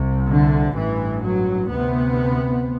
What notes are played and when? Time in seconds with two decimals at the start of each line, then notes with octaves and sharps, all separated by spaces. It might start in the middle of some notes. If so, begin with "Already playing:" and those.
Already playing: C2 C3
0.27 D3
0.74 A1 G2 E3
1.22 F#3
1.69 D2 C3 B3